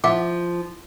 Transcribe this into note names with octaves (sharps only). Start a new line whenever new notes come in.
F3 E5 F#5 D6